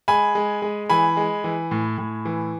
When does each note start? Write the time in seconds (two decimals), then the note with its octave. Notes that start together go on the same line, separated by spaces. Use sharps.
0.08 G#3 G#5 B5
0.35 G#3
0.62 G#3
0.90 E3 G#5 B5
1.17 G#3
1.44 E3
1.71 A2
1.98 A2
2.25 E3